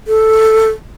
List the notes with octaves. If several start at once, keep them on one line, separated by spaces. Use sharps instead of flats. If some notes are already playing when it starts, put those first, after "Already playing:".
A4